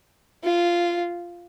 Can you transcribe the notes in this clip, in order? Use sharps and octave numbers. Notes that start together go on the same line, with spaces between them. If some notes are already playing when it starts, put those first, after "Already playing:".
F4